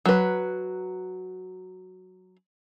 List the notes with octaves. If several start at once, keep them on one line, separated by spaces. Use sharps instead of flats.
F#3 B4